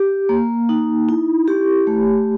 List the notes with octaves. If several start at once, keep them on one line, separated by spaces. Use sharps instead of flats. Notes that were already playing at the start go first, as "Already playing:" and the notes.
Already playing: G4
A#3
D#4
E4
G4
A3